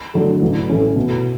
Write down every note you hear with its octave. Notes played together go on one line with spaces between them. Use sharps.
D3 F#3 A3
A1
A2 E3 A3 C#4
B2